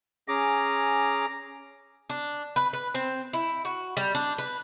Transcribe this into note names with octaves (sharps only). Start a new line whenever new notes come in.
C#4 G#4 A#5 D6
D4
B4
B4
C4
E4
F#4
G3
D4
B4